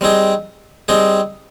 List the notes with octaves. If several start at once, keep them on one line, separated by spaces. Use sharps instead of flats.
G3 C4 D#4 G#4
G3 C4 D#4 G#4